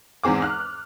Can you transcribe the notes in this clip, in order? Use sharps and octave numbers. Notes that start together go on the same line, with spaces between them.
E2 G#2 C4 G#4 D6
F6 F#6